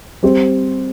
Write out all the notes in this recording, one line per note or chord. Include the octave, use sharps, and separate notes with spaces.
G3 C4 G4 C5